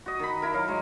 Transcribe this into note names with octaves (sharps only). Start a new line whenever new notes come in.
F#4 D#5
D#3 B5
E4 A#4
F#3 F5
F#3 G#3